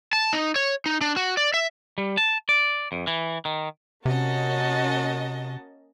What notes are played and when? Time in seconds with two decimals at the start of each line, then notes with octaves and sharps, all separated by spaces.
0.13 A5
0.33 D#4
0.56 C#5
0.86 D#4
1.01 D4
1.16 F#4
1.37 D5
1.54 E5
1.98 G3
2.17 A5
2.49 D5
2.92 F2
3.07 E3
3.45 D#3
4.06 C3 A#3 C#4 F#4 D#5 A5